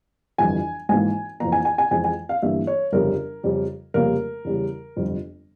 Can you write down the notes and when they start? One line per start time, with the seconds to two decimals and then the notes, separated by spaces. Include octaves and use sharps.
0.38 G1 F2 E3 G#5
0.89 G#1 G#2 E3 A#3 G#5
1.40 F2 E3 A#3 A#5
1.52 G#5
1.65 G#5
1.78 G#5
1.91 F2 E3 G#3 G#5
2.04 G#5
2.29 F5
2.42 G1 G2 E3 G3 A#3 E5
2.67 C#5
2.92 G1 F2 C#3 G3 A#4
3.43 F2 C#3 G3
3.94 F1 F2 C#3 G3 A#3 A#4
4.45 E2 C#3 G3
4.96 G1 F2 C3